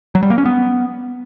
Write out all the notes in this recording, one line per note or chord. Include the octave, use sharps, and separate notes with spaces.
F#3
G3
A#3
C#4
B3